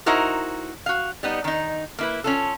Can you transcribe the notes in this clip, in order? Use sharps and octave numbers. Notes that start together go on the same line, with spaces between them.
D#4 E4 F#4 A#4 C5
F#4 F5
G3 B3 D#4
D#3 D#4
A#3 E4 B4
C#4 F4 A4